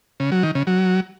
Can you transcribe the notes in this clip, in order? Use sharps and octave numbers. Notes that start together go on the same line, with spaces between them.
C#3
F#3
D#3
C#3
F#3